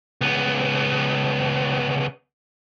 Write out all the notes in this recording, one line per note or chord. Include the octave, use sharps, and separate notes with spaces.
C#2 B3